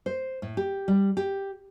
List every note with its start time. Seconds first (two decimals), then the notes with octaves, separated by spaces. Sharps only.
0.06 C5
0.42 A2
0.57 G4
0.88 G3
1.17 G4